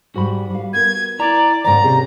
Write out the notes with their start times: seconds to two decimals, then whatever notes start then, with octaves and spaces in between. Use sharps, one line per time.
0.16 G#2 G3 F#4 B5
0.50 G3 F5
0.73 B3 A#4 G#6
1.19 E4 D5 A#5
1.65 D#2 G#2 C#3 D5 A#5
1.84 C3 C#4 G4 G#4